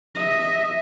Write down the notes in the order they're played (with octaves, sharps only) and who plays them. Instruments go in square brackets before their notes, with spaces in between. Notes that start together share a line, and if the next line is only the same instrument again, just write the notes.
[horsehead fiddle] D#5 E5